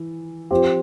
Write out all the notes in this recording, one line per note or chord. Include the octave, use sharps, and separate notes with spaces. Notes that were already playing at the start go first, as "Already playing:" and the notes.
Already playing: E3
F3 C4 G4